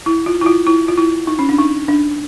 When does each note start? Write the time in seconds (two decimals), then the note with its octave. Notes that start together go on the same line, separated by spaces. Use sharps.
0.06 E4
0.26 F4
0.42 E4
0.46 F4
0.67 E4
0.88 F4
0.98 E4
1.27 D#4
1.39 C#4
1.49 D4
1.58 D#4
1.88 D4